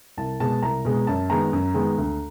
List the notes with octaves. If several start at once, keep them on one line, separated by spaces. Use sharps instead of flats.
C2 A5
B2 G#3 A5
C2 A#5
B2 G#3
F#2 A5
D#3 G#3 B3 A#5
F#2
D#3 G#3 B3
D2